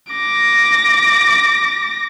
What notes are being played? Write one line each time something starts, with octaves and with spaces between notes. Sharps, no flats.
D6 A#6